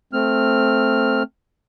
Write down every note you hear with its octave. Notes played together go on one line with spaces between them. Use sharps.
A3 C4 F6